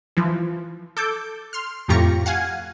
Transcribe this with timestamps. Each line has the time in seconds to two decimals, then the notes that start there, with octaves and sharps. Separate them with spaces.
0.17 E3 F3
0.97 A4 D6 G6
1.53 C6 F6
1.88 F2 A2 F4 G4 A#5 C#6
2.26 F5 F#5 G#5